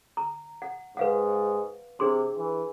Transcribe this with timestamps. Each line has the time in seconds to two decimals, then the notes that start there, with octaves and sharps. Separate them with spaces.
0.17 A#5
0.62 F#5
0.97 G#2 B4 F5 F#5
2.00 C3 D4 G#4 C6
2.37 E3